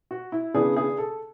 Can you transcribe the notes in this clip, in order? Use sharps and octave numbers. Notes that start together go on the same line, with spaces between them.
F#4
E4
C#3 E3 B3 D4 G#4
G#4
A4